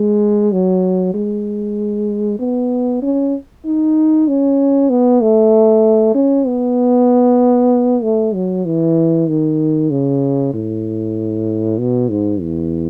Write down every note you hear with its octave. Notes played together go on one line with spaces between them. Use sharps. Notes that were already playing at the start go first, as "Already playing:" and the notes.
Already playing: G#3
F#3
G#3
B3
C#4
D#4
C#4
B3
A3
C#4
B3
A3
F#3
E3
D#3
C#3
A2
B2
G#2
E2